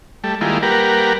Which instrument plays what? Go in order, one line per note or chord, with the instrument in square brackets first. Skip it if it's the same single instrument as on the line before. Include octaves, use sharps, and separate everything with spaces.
[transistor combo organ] G3 A3
D#3 G3 G#3 A#3 E4 F4
G3 A#3 G4 A#4 B4 F#5